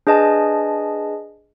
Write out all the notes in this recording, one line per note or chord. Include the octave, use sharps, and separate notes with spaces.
D4 G#4 B4 D#5 G#5 A5